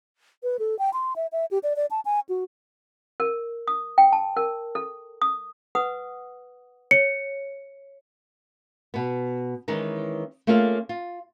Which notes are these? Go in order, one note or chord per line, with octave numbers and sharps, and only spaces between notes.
B4
A4
G5
C6
E5
E5
G4
D5
D5
A5
G#5
F#4
A#4
D#6
G5
A5
A#4
A4
D#6
B4 F#5 D#6
C#5 C#7
B2 B3
D#3 E3 G#3 C#4 D#4
A3 A#3 C#4 F4 G#4 F5
F4